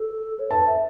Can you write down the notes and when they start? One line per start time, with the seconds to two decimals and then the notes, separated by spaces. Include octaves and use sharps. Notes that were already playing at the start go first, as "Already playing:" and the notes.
Already playing: A4
0.39 C#5
0.49 B4 A5
0.66 E5